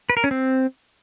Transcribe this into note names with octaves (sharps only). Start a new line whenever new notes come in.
B4
A#4
C#4
C4